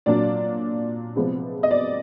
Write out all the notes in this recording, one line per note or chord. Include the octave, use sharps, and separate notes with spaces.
A#2 F#3 A#3 D4 D5
C3 F3 G#3 B3
D#5
D5